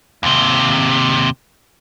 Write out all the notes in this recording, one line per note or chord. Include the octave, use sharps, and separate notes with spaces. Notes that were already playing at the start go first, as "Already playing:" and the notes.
D#2 C3